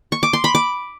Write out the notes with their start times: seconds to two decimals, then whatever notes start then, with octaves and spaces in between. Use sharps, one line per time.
0.12 C#6
0.23 D6
0.33 C6
0.44 B5
0.55 D6